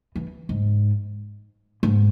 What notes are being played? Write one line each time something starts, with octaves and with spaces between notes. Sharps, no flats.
E3
G#2
G#2